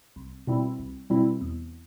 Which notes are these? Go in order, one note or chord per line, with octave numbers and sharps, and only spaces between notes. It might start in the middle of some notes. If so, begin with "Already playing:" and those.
C2
B2 G3 C4 E4
C2
B2 G3 C4 E4
E2